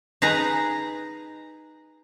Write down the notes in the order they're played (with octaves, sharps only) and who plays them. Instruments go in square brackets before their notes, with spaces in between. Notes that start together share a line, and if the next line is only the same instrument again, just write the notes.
[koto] D#4 G#4 B4 A#5